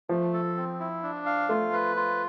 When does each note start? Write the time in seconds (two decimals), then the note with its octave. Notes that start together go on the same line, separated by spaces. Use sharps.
0.09 F3 A3
0.33 A4
0.57 C4
0.80 E4
1.03 D4
1.26 F5
1.49 A3 F4
1.73 B4
1.96 F4